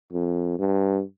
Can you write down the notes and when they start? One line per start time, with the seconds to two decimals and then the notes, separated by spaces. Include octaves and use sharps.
0.13 F2
0.59 G2